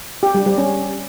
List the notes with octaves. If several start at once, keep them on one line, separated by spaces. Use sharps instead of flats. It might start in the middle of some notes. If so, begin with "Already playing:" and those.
G4
G3
G3
C#4